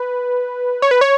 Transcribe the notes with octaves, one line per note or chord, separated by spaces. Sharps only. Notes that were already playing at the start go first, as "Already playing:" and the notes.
Already playing: B4
C#5
B4
C#5